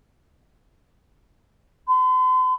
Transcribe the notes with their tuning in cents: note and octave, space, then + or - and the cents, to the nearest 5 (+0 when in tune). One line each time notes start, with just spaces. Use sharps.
C6 -45